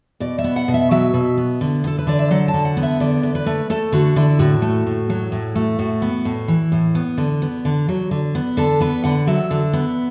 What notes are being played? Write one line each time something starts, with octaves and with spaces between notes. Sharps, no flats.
B2 D5
E5
B3
F#5
B2
E5
F#3 E5
B2
B3
D3
B3
A4
B4
D3 D5
E5
F#3 F#5
A5
D3
F#5
B3
E5
D3 D5
D3
B4
A3
A3 A4
D3 F#4
D3 E4
A2 F#4
A3
A2
F#3
A2
A3
A2 F#4
B3
A2
E3
A2
B3
D3
B3
D3
F#3
D3
B3
D3 A4
B3 B4
D3 F#5
F#3 E5
D3
B3